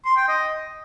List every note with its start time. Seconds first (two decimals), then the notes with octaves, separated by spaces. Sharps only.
0.05 C6
0.16 G5
0.28 D#5